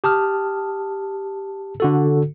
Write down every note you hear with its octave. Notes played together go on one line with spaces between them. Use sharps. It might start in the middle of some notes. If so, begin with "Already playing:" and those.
G4 A5 D#6 F6
D3 F#4 A4